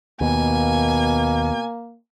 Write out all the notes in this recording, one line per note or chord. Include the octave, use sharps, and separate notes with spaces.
D#2 B2 A#3 G#5